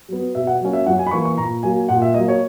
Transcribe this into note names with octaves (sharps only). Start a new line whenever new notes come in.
F#3 B3
B2 E5
F#5
F#3 A#3 C#4
E5
F#2 F#5
G#5
B5
E3 A#3 C#6
C#6
A#2 A#5
F#3 A#3 G#5
A#2 F#5
E5
F#3 A#3 D#5
C#5